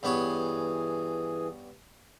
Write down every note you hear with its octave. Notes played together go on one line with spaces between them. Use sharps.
G2 E3 B3 G#4 C#5